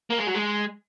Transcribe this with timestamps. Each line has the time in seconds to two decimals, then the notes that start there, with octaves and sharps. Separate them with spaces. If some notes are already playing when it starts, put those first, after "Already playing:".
0.10 A#3
0.18 G#3
0.27 F#3
0.35 G#3